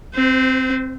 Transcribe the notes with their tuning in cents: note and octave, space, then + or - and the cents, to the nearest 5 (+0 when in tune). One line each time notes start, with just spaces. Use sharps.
C4 +0 C5 -35